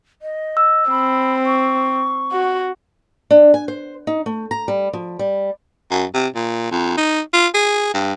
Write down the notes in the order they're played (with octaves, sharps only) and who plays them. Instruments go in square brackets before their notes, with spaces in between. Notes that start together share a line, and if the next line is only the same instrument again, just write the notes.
[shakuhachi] D#5
[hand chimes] E6
[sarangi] C4 [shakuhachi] B5
[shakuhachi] C#6
[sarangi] F#4
[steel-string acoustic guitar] D4
G#5
C5
D#4
A3
A#5
G3
F3
G3
[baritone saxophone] F#2
C3
A#2
F2
D#4
F4
G#4
G2